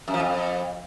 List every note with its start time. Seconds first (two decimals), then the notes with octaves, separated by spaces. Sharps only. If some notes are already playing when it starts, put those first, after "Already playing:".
0.08 F#2
0.14 F3
0.20 F2